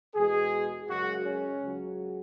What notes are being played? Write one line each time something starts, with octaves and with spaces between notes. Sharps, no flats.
E2 B2 G#3 G#4
F#2 C#3 G#3 F#4
C#4
C#2 C#3 F#3